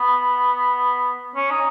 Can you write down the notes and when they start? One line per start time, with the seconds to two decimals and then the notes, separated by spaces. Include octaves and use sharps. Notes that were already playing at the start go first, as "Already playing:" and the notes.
Already playing: B3
1.35 C#4
1.51 D#4